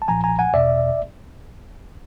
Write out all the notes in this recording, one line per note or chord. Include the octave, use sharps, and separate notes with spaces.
A5
B1 A#2 F3 G#5 A#5
G#5 A#5
F#5 G#5
E2 B2 D5 E5